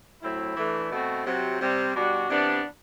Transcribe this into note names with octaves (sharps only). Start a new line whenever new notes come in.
A2 F#3 C4 E4
E3 A3 D4
B2 A3 C4 F#4
C3 F#3 C4
C3 G3 C4
B2 G3 D4 F#4
C3 E3 B3 D4